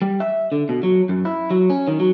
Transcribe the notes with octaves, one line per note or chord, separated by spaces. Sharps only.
G3
E5
D3
B2
F#3
F#2
E4
F#3
C#4
D#3
F#3